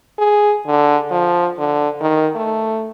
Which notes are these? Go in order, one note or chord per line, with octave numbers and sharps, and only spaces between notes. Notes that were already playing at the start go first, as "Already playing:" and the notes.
G#4
D3
F3
D3
D#3
A3